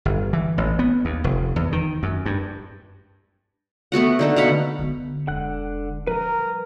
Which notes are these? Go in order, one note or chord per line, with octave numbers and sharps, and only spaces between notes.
G1
E3
A1
B3
D#2
F1
E2
D#3
F#2
G2
A3 B3 F#4 F#5
D3 D#4 A4
B2 F5 F#5 B5
D3 B3
E1 F#2 D3 F#5 F#6
F3 G3 A#4 B4 A#5